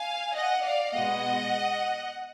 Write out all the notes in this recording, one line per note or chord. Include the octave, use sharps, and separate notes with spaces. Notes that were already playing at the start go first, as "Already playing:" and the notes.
Already playing: F5 G#5
D#5 F#5
D5 F5
B2 G#3 B3 D#5 F#5